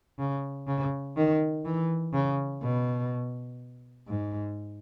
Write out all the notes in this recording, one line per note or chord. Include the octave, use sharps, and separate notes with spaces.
C#3
C#3
D#3
E3
C#3
B2
G#2